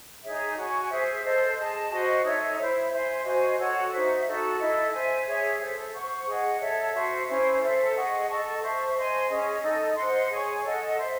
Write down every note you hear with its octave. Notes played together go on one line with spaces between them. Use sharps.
D#4 G#4 C#5 E5
F#4 C#5 G#5 C#6
G#4 C5 E5
A4 C5 D#5
G#4 D#5 A5
F#4 C5 D#5
D#4 A4 C#5 E5
E4 C5 E5
C5 E5 G#5 C6
F#4 C5 D#5 G#5
F#4 A4 C#5 F#5
D#4 F#4 C5 E5
D#4 F#4 A4
E4 A4 D#5
C5 E5 G#5
G#4 C#5 E5
A4 C5 E5
C5 F#5 C#6
G#4 D#5 F#5
A4 C#5 E5 A5
F#4 C5 E5
C#4 E4 C5
A4 C5 E5
G#4 D#5 F#5 C#6
A4 D#5 A5 C#6
C5 E5 A5 C#6
C5 D#5 G#5 C6
C#4 G#4 D#5
D#4 A4 D#5
C5 D#5 F#5 C6
G#4 C#5 G#5 C#6
A4 D#5 F#5
C5 E5 C6